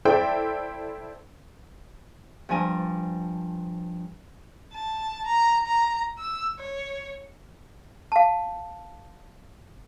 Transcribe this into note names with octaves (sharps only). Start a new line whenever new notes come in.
E4 A4 C5 D5 E5 G5
G2 F3 D4 G#5 A#5
A5
A#5
A#5
E6
C#5
F5 A5